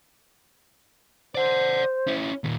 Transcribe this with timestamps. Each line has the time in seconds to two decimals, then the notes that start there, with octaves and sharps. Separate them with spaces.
1.35 C5 D5 F#5
2.07 C#4 E4
2.44 D#2 A#2